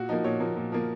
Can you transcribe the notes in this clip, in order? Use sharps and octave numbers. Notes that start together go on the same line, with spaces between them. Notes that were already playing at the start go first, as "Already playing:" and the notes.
Already playing: A#2 F#4
F3 A#3 D#4
A#2 C#5
F3 A#3
A#2
F3 A#3